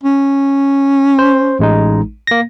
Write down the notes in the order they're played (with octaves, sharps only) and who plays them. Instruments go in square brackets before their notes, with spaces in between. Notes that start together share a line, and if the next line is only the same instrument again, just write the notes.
[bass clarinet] C#4
[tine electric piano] C5
A1 G#3 D#4
A#3 A#6